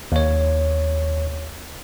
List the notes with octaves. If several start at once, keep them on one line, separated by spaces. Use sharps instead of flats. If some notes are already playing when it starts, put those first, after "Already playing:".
D#2 C#5